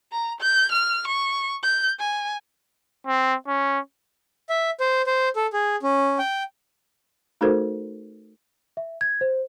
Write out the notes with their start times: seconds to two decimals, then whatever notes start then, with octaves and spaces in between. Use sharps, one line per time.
0.12 A#5
0.41 G6
0.72 F6
1.08 C#6
1.63 G6
1.99 G#5
3.07 C4
3.47 C#4
4.49 E5
4.80 C5
5.07 C5
5.36 A4
5.53 G#4
5.83 C#4
6.19 G5
7.41 A3 D#4 F#4 A4 A#4 C5
8.77 E5
9.01 G#6
9.21 C5